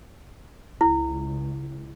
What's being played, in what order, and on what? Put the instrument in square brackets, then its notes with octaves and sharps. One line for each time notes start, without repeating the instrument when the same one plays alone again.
[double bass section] C#2 [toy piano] E4